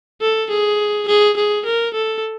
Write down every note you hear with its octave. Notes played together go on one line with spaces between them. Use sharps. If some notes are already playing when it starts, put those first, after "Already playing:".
A4
G#4
G#4
G#4
A#4
A4